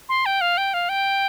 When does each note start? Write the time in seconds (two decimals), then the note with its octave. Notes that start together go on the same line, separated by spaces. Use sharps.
0.09 C6
0.26 G5
0.41 F5
0.58 G5
0.74 F5
0.89 G5